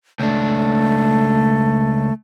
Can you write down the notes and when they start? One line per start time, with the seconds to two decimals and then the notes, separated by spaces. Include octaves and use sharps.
0.20 C#2 A3 D4